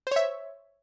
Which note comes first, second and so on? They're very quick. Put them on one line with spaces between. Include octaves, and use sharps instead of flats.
C5 C#5 E5